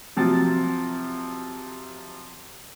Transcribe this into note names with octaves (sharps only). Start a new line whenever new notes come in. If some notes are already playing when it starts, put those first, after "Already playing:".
C3 F3 F#3 A6